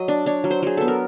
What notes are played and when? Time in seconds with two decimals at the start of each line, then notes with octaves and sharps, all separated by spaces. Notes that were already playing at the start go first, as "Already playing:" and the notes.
Already playing: F#3 D#5
0.08 D4
0.26 D4 C#5
0.44 F#3
0.50 C5
0.63 F#3 G#4
0.77 B3 A4
0.88 A#4